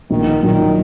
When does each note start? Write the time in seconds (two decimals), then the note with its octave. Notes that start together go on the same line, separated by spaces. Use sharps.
0.10 A#1 D#3
0.43 A#2 D#3 F#3